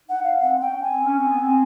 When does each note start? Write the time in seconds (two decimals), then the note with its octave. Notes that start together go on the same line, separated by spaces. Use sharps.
0.09 D#4 F#5
0.24 F5
0.40 C4 F#5
0.61 C#4 G5
0.82 C4 G#5
1.05 C#4
1.17 C4
1.29 B3
1.41 C4